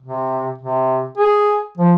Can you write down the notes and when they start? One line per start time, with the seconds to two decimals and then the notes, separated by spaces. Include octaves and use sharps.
0.02 C3
0.58 C3
1.17 G#4
1.78 F3